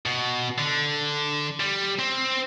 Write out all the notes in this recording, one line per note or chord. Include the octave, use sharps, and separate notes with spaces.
B2
D3
G3
C4